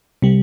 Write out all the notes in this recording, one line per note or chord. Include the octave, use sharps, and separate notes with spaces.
C3 G3